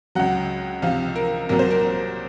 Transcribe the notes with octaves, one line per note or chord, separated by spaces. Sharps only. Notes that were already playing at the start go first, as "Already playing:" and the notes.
C#2 C#3 F#3 F#5
C#2 C3 F3 F5
A#4
C2 A#2 F#3 A#4
C5
A#4